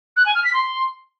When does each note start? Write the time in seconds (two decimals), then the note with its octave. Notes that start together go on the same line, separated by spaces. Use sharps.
0.16 F#6
0.25 G#5
0.35 F6
0.44 B6
0.53 C6